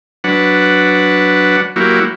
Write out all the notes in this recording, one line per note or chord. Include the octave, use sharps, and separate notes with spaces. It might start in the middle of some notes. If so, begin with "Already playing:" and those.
F#3 D4 B4 F#5
F#3 A#3 E4 F#4 G4